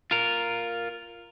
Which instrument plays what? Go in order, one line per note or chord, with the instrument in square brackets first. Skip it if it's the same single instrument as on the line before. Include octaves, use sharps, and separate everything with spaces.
[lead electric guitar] F4 A#4